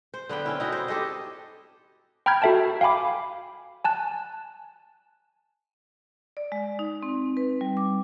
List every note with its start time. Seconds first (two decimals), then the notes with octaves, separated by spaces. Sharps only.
0.14 C5
0.29 D3 B3 B4 G5
0.46 C4 C#4 E4
0.60 D#4 E4 F#4
0.72 C5
0.88 G4 A4 C5 D#5
2.26 G5 A#5 B5 F6 G6 G#6
2.42 F#4 A4 E5 G5 A5
2.81 F5 G5 G#5 B5 D6
3.84 G#5 A5 F#6
6.37 D5
6.52 G#3
6.79 D#4
7.03 C4
7.37 B4
7.61 G3
7.77 D6